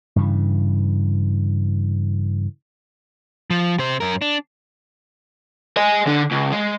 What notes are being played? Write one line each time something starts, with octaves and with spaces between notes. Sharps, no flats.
G2 C#3 E3
F3
C3 C5
F#2 A#4
D4
D#5 G#5
D3 D4
C#2
G#3